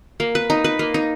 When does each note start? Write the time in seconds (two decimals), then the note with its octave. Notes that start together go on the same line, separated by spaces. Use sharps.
0.20 A#3
0.35 B4
0.50 D#4
0.64 B4
0.79 A#3
0.94 D#4